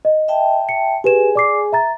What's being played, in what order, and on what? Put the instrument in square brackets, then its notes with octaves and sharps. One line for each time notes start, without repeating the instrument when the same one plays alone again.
[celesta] D#5
[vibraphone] E5 G5 A5
[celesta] C#7
[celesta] G4 B4 E7 [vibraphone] G#4 G#5
[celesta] D5 D6 C7
E5 A#5 A6